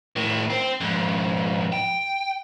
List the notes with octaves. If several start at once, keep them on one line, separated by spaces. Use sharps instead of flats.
A2 D#3
C4
F2 G#2
G5